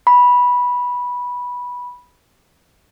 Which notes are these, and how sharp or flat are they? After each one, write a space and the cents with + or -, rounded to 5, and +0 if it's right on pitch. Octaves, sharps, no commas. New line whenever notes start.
B5 -10